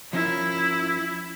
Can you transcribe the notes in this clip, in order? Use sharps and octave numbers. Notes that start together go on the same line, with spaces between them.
F3 C#4 E4 A#4